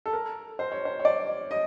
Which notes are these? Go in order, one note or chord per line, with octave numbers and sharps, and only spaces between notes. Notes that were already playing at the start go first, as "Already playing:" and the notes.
A4
A#4
C5
C#5
C5
C#5
D5
D#5